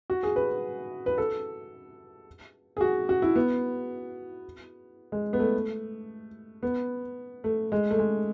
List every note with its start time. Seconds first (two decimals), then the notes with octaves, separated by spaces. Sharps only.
0.10 F#4
0.23 G#4
0.36 B4
1.06 B4
1.18 A4
2.77 G#4
2.81 F#4
3.09 F#4
3.22 E4
3.36 B3
5.12 G#3
5.33 B3
5.39 A3
6.63 B3
7.44 A3
7.72 G#3
7.91 A3
7.99 G#3